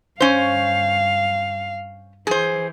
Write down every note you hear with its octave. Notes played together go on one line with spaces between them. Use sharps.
G2 C#4 C5 F5
E3 G#4 C5